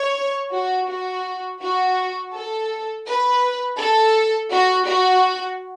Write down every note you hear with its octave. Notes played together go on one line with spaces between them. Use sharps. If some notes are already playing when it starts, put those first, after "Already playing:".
Already playing: C#5
F#4
F#4
F#4
A4
B4
A4
F#4
F#4